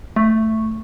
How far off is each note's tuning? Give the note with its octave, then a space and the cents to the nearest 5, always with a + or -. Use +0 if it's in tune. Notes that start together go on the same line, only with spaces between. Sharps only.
A3 +5